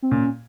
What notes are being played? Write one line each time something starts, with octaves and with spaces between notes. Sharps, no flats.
C4
A#2 C#4